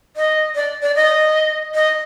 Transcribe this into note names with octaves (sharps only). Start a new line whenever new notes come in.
D#5
D5
D5
D#5
D#5